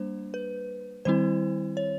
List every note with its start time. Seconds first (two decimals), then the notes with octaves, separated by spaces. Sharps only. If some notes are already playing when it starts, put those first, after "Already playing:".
Already playing: G3 A#3 D4 C5
0.34 B4
1.05 D#3 G3 C4 E4 C5
1.77 C#5